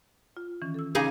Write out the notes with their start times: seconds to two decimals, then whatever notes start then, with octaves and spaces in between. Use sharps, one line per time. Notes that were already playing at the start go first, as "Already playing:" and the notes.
0.37 F4
0.62 D#3 E3 C#4
0.74 A4 E6
0.95 C#3 D#4 G#4 F5 D6 D#6